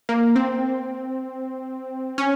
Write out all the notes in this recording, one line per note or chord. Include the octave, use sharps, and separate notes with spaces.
A#3
C4
C#4